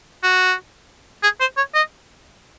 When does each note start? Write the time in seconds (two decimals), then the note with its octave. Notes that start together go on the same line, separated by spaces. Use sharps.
0.23 F#4
1.23 G#4
1.40 C5
1.57 C#5
1.74 D#5